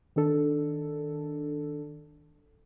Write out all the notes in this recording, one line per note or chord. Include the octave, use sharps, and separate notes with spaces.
D#3 D4 A4